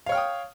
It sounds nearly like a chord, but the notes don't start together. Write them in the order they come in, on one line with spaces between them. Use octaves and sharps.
F5 C#5 F6 G5 D#6